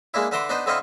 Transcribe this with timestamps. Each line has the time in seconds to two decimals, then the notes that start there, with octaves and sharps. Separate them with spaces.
0.14 G#3 A#3 D4 E4
0.32 D3 B4 E5 A#5 C6 D6
0.49 B3 D4 D#4 B4 C5
0.66 D3 C4 E4 D#5 F5 C#6